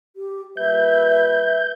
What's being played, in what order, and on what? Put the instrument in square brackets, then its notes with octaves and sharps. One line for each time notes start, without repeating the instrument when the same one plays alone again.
[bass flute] G4
[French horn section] A#2 G3 B4 [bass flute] E5 [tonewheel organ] G6